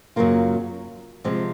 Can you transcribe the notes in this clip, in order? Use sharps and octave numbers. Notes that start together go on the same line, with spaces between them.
F#2 C#3 F#3 A#3 F4
C3 F3 G#3